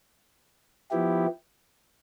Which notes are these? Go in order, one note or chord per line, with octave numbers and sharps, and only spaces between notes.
F3 B3 E4 G4